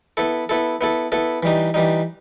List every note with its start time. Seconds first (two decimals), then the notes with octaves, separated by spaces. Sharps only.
0.17 B3 E4 A4
0.49 B3 E4 A4
0.81 B3 E4 A4
1.12 B3 E4 A4
1.43 E3 G3 D#4
1.74 E3 G3 D#4